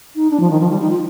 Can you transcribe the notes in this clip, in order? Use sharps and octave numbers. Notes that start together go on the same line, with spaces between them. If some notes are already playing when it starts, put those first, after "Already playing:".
D#4
D4
F3
D#3
F3
G3
D#4
F4